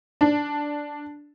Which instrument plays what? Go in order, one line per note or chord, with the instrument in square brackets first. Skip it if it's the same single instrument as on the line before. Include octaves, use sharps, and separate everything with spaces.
[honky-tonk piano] D4